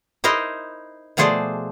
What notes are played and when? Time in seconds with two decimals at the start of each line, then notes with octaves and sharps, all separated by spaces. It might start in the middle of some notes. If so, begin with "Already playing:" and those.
0.24 D#4 E4 A#4 C5 D#5
1.17 B2 F3 A3 G#4 C5 D5